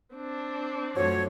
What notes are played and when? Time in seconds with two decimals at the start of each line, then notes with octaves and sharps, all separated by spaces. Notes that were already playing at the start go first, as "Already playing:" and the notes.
0.15 C4 D4
0.96 F#2 F3 A3 F#4 C5 C#5